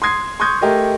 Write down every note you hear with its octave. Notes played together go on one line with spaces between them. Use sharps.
C6 D#6 G#6 C7
C6 C#6 D#6 G6 G#6
A3 G4 A#4 D#5